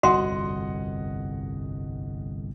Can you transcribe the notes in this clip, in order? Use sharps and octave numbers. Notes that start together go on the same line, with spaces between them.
G1 C2 F2 F#4 D#5 F#5 C6